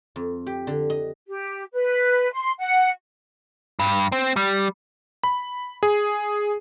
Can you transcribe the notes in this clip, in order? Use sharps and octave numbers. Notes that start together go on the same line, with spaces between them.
F2
G4
D3
D#5
G4
B4
C6
F#5
G2
C4
G3
B5
G#4